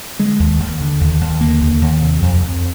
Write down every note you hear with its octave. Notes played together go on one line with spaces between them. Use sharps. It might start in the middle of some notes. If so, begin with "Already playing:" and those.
D3 G#3
D#2
D#2
D3
D#2
D#2
D3 A#3
D#2
D#2
C3
F2
F2